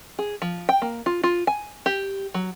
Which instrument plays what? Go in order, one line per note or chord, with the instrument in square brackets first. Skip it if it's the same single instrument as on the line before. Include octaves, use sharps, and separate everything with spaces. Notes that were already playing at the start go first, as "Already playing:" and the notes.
[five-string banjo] G#4
F3
G5
A#3
F4
F4
G#5
G4
F#3